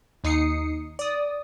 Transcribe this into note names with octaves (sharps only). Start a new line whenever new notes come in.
D#2 D#4 D#6 C7 C#7
D5 D#6